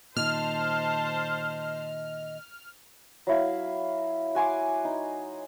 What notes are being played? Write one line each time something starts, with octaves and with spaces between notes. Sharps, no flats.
A#2 D#3 C5 D#5 A5 F6
F#3 E4 F5
F#4 G#5 C6 D6
D#4